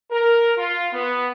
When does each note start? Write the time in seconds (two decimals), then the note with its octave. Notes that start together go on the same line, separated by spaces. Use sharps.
0.11 A#4
0.58 F4
0.93 B3